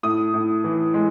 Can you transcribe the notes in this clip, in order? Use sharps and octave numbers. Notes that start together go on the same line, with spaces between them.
A2 D#6
A2
E3
G#3